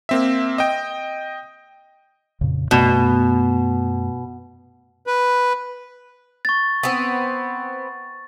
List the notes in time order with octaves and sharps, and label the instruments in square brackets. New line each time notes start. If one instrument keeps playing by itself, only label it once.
[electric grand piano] A#3 C4 E5
D#5 G5
[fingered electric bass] F2 A#2 C#3
[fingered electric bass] F#2 A3 B3 [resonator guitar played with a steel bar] B2
[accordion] B4
[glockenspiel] C#6 A6
[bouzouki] B3 C4